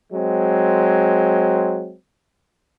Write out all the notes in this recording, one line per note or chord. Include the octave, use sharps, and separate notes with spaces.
F#3 G#3 C4